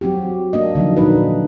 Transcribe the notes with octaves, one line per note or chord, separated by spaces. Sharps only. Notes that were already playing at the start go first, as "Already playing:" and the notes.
F#3 C4 F#4 G4
A#3 D4 D#5
D3 D#3 F3 F#3
A#2 A#3 D4 D#4 B4